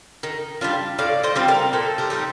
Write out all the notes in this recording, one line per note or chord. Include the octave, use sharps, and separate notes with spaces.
D#3
G3 D4 F4
A2 D5 F5
C5 D#5
G3 C4 F4
A#4 D5
A#2 A4 C5
G4 A#4
G3 C4 D#4